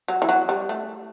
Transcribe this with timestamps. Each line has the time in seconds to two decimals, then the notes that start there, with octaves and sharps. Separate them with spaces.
0.08 F#3
0.22 E3
0.29 F#3
0.49 G3
0.69 A3